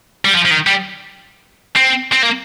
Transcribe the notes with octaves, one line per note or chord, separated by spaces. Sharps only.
G3
F3
F3
D#3
G3
C4
C4
A#3